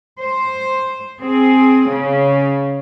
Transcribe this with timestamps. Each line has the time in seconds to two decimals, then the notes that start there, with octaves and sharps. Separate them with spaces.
0.20 C5
1.20 C4 G#4
1.88 C#3